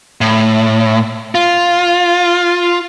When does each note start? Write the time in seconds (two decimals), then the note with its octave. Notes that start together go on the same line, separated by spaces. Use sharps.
0.21 A2
1.35 F4